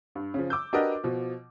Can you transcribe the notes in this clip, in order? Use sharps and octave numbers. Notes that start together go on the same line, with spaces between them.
G2
C#3 F3
D6 E6 G6
D4 F#4 G4 A#4 B4 D#5
B2 F3